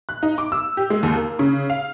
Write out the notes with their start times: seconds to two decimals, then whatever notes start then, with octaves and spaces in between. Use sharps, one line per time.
0.09 F#6
0.23 D#4
0.38 D6
0.52 E6
0.77 G4
0.90 G#3
1.03 D#2
1.16 A#3
1.39 C#3
1.70 F5